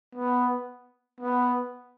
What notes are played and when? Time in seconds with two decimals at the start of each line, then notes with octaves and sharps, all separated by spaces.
0.15 B3
1.20 B3